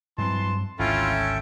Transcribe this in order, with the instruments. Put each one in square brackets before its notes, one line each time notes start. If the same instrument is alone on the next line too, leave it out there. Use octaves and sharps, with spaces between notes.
[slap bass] G2 F#3 C4 [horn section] E3 A5 C6
[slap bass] G#1 D2 [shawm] C#4 [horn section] E4 F4 [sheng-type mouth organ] A4 E5 G5